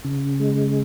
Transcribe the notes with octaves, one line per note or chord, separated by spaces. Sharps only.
C#3
G#3